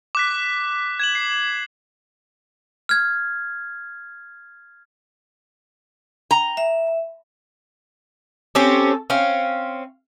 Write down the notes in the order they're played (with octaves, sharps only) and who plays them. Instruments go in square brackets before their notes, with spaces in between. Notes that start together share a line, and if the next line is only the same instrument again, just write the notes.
[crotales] D6 F#6 B6
G#6 E7 F#7
C7
[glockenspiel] F6 G#6
[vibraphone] G5 [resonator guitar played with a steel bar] A#5
[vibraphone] E5
[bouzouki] C4 C#4 G4 [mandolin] A4
[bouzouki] C4 C#4 [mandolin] F5